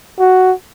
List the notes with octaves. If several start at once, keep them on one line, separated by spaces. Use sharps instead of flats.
F#4